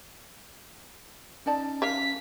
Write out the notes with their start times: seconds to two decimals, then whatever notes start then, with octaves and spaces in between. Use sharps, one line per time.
1.46 C#4 D#4 D5 A5
1.82 A#4 E5 F5 B6